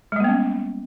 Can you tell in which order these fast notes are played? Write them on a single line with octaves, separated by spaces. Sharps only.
G#3 G3 A#3 B3 C#4